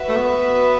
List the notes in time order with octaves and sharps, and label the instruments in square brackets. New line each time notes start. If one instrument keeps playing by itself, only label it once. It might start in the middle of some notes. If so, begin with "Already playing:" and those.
Already playing: [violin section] F#4 B4 E5
[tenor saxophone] A3
B3